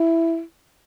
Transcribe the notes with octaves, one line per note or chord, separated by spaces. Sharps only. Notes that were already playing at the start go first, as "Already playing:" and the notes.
Already playing: E4